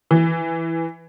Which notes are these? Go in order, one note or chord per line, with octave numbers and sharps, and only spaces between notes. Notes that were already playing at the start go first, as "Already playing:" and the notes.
E3